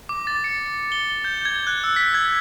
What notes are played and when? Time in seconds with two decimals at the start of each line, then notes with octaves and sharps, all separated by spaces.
0.09 D6
0.27 A6
0.44 C#7
0.66 C#7
0.92 G7
1.24 G6
1.45 G#6
1.67 F#6
1.84 E6
1.96 B6
2.14 G#6